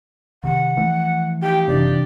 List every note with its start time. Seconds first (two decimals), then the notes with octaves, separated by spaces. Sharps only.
0.44 C3 D#3 F#5
0.77 E3 F3 A3
1.43 D#4 F4 G4 G5
1.68 F#1 C3 E3 D4 D5